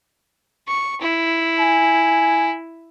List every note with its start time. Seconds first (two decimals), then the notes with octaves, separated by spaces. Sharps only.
0.68 C#6
1.01 E4
1.59 G#5